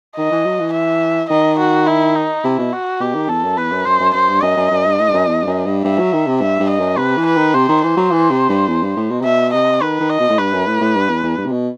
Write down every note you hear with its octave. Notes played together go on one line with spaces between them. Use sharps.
D#3 D#5
E3
F#3
E3
E5
D#3 D#5
F#4
E4
D#4
C3 E4
B2
F#4
B2 G4
D#3
E2 A4
F#2
E2 B4
F#2
F#2 C5
F#2
F#2 C5
G2
F#2 D#5
F#2
F#2
G2
A2
G2
F#2
E2
G2
F#2
G2
G2 E5
F#3
D#3
C3
G2 E5
G2
D#5
F#2
C3 B4
E3
B4
D#3
C3 C5
D#3
E3 C5
F#3
E3
C3
G2
E2
G2
A2
B2
C3
B2 E5
C3 D#5
D#3 B4
D#3
D#5
B2
A2
G2 B4
F#2
A2
A2
G2
E2
E2
G2
C3
B2